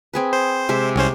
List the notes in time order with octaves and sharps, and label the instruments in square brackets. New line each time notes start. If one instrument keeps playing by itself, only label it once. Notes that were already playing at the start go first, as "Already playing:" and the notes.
[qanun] C4 G#4 B4
[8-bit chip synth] C5
[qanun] C3 G#3 E5
[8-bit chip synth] C2 C#4 C5